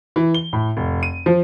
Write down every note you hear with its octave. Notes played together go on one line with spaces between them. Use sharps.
E3
G7
A2
F1
D#7
F3